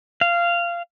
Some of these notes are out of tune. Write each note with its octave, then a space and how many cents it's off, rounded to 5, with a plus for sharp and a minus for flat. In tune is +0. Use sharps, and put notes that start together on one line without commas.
F5 -15